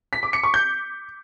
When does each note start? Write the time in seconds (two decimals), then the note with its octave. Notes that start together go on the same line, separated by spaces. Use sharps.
0.13 B6
0.23 D6
0.33 C#7
0.43 C#6
0.54 G6